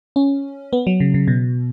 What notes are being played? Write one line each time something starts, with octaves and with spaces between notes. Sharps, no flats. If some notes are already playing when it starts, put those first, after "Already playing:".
C#4
B3
F#3
C#3
C#3
B2